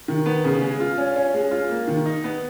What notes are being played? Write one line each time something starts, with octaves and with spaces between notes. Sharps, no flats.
D#3
B3
C#3
G#3
F4
C#4
C#4
G#3
F4
A#3
D#3
D#4
B3